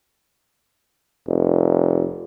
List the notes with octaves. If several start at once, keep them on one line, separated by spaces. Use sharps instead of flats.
F1